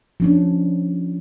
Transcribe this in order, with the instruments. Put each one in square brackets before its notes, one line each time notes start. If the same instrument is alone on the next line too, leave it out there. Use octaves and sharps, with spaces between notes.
[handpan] F3 C#4 D4